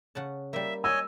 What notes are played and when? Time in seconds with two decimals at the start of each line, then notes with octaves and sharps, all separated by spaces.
0.15 C#3 F#5 A5
0.53 G3 A#3 E5
0.84 C#5 D#5 G#5 E6